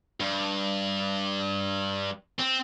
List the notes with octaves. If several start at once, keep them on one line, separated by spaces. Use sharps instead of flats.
G2
C4